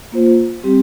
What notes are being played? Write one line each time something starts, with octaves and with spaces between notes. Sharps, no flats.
A#3 F4 C5
G3 C4 G4